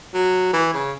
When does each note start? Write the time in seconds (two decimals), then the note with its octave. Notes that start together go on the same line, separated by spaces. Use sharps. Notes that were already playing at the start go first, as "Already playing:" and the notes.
0.14 F#3
0.53 E3
0.74 C#3